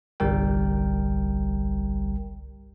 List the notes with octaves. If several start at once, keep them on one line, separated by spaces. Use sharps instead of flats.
G1 C2 G3 A#4 G5